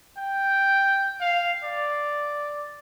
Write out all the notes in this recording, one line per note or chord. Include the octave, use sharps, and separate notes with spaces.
G5
F5
D5